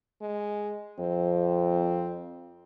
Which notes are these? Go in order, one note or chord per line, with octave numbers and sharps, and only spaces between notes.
G#3
F2 C4